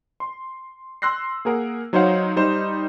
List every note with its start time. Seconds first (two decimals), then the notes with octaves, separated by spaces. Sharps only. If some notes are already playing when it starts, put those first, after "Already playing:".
0.20 C6
1.02 C6 E6 F#6 A#6 C7
1.45 A#3 G#4 A#4 F#5
1.93 F#3 D#4 C5 C#5 F5 F#5
2.36 G3 D#4 C5 E7